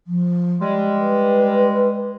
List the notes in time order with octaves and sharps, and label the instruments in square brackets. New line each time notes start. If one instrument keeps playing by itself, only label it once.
[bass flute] F3
[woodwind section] G3 G#3
[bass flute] B4